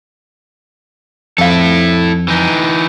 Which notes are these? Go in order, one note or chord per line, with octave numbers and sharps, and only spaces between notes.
F2 E4 A4 F5
E3 D#4